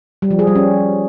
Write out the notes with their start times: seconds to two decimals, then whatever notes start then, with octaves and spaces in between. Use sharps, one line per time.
0.22 G3
0.31 F3
0.39 G#4
0.47 G3
0.55 C#4